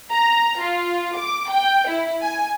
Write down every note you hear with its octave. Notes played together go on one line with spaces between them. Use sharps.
A#5
F4
D6
G5
E4
G#5